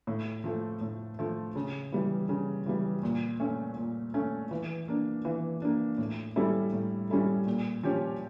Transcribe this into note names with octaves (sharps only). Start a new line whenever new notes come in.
A2
F3 A3
A2
F3 A3
C#3
E3 G3
C#3
E3 G3
A#2
A3 C#4
A#2
A3 C#4
E3
A#3 D4
E3
A#3 D4
A2
G3 C#4 E4 A4
A2
G3 C#4 E4 A4
A#2
F3 C#4 G4 C#5